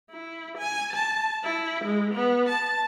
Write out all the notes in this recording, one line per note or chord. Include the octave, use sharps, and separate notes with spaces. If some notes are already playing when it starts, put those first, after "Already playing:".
E4
G#5
A5
E4
G#3
B3
A5